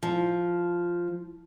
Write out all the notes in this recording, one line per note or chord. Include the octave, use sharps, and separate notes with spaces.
F3